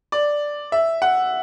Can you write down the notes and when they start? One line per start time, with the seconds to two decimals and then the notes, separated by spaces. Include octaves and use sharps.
0.12 D5
0.72 E5
1.02 F#5